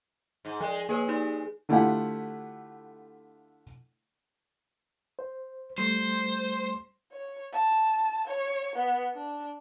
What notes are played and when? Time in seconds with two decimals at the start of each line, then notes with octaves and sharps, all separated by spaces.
0.45 G#2
0.60 F3 G#3 D5
0.89 A#3 G#4 B4 C#5
1.08 D#4 G4 D5
1.69 D3 A3 E4 F4 G4 F#5
5.19 C5
5.78 G3 A3 C5
7.12 C#5
7.52 A5
8.27 C#5
8.76 B3
9.14 D4